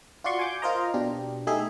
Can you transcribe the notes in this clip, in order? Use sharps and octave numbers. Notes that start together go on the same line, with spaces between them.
F4 F#4 D5 C6 C#6
G#5 D6 G6
F4 A#4 C5 D#5 A#5
B2 D4 G4
A3 D#4 G4 G#4 E5